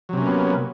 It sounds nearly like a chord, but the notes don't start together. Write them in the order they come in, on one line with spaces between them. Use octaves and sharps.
F#3 C3 C#4 A#3 B3